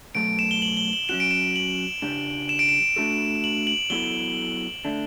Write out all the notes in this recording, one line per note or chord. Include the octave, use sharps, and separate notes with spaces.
B2 F#3 A3 D7
E7
G7
F#7
G7
F#7
F#3 C#4 F#4 E7
D7
E7
F#7
C#3 G3 D4 G4
E7
D7
E7
A3 D4 F#4 A4
F#7
F#7
F#3 B3 E4 A4 G7
D3 A3 D4